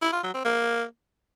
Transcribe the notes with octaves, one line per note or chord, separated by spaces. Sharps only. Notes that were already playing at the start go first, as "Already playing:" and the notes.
E4
F4
F#3
C4
A#3